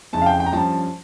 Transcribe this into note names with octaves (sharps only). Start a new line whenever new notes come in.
F2 C#3 E3 A5
F5
G5
G5
A#5
G2 F3 C#4 A5